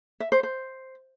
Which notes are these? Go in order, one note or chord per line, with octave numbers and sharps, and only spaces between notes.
E5
C5
C5